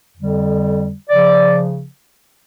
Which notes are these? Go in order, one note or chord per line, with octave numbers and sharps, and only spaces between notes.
F2 D3 G3
C#3 F3 D5